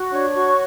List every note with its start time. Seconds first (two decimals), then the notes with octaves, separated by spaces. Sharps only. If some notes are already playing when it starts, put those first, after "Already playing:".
Already playing: F#4
0.10 D4 C#5 C#6
0.34 F#4